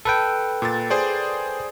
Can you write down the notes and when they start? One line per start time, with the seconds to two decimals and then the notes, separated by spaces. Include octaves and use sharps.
0.05 A4 B4 G5
0.62 A#2 A6
0.90 G#4 C5 D5